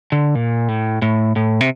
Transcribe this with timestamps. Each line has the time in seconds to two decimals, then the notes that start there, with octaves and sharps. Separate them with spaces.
0.12 D3
0.35 A#2
0.68 A2
1.02 A2
1.36 A2
1.61 C3